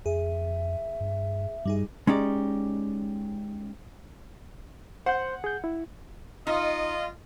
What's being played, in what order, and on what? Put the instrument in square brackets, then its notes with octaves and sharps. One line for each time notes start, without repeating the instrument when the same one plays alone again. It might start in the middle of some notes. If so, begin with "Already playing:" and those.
[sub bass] F2 [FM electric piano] G#4 [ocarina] E5
[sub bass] G2
[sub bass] G2 [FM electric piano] G3 D#4 G#4
[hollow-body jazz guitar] G#3 C#4 D#4 G4 D5
[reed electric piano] C5 C6 G6 [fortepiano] F#5
[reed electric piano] G#4 G6
E4
[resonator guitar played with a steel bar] D#4 [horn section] F4 D#5